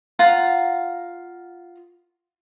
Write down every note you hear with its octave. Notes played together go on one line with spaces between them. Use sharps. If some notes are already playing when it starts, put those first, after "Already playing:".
F4 F5 F#5 A#5